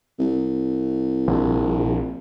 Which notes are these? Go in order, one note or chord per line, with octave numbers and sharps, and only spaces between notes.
C2
A#1